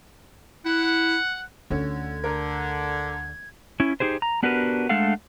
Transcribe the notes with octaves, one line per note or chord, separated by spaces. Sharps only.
E4 F#5
D2 D3 C#4 G#6
D3 A#4
C#4 E4
D#4 G4 G#4 C5
A#5
B3 D4 F#4 G4 A#4 B4
G#3 A3 D4 A4 F5 F#5